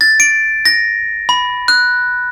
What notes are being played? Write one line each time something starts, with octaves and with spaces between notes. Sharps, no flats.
A6
D7
A#6
B5
F#6